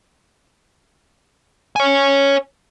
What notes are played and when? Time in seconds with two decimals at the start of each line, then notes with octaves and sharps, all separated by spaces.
1.76 C#5 G#5